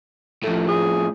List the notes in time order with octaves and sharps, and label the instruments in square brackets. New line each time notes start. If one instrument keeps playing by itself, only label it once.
[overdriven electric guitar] A2 F3 [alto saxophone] A3
[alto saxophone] G#4